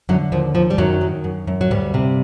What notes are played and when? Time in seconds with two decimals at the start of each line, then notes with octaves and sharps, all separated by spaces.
0.09 F#2 D3 F#3
0.32 D#2 F3
0.55 D#2 F3
0.70 G3
0.78 F#2 D#3 F#3
1.01 D#3
1.24 F#2
1.47 F#2
1.61 F#3
1.71 D2 G2 G3
1.94 C3